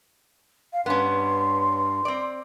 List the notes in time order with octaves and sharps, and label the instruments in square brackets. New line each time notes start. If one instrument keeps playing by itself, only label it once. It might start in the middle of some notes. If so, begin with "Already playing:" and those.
[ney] F5
[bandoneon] G2 [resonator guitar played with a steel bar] B3 C#4 [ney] C6
[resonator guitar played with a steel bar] C4 D5